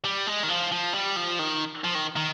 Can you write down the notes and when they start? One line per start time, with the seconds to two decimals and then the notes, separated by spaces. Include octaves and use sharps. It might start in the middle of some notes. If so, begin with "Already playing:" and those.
0.04 G3
0.27 G#3
0.43 D#3
0.49 F3
0.71 F3
0.94 G3
1.16 F3
1.39 D#3
1.84 F3
1.95 D#3
2.17 D#3